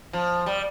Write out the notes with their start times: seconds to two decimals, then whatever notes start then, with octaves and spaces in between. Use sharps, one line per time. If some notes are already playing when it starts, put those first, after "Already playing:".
0.13 F3
0.46 G3